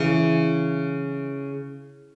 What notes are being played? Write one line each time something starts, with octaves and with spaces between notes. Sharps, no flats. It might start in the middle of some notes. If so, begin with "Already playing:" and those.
Already playing: C#3 E3